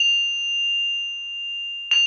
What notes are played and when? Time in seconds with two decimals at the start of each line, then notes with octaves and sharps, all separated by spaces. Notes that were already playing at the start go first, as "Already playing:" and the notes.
Already playing: F7
1.91 F7